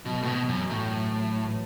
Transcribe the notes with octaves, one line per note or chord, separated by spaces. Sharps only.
B2 F#3
A2
B2
E3
F#2
F#3
A2
A3
F#3
E3